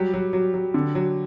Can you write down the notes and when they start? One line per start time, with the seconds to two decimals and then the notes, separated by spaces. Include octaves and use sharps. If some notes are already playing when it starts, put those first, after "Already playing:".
Already playing: F#3 G3 G4
0.14 F#3
0.33 F#3
0.54 F#3
0.74 D3
0.95 F#3